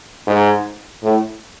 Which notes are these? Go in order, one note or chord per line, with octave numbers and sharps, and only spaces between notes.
G#2
A2